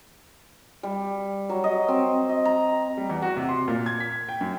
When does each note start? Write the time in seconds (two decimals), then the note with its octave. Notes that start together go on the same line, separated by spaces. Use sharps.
0.83 G3
1.49 F#3
1.64 D#5
1.88 C4
2.29 D#5
2.45 A#5
2.97 G3
3.09 E2
3.22 F#4
3.36 C3
3.49 C6
3.68 A#2
3.86 G#6
4.00 B6
4.29 G5
4.41 F#2